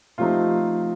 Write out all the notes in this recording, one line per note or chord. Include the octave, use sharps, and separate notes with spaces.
C3 F3 A3 C4 D#4 F4